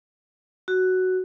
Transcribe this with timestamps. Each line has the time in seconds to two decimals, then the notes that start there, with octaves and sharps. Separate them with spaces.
0.68 F#4